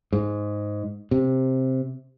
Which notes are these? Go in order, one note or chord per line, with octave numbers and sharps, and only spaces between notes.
G#2
C3